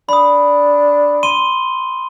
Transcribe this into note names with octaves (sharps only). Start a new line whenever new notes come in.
D4 B5 D#6
C6 D#7 G7